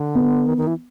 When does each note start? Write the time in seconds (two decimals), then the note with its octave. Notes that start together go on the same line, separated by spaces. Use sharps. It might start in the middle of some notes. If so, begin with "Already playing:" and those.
Already playing: D3
0.15 B3
0.46 D#3
0.57 D#3
0.67 E3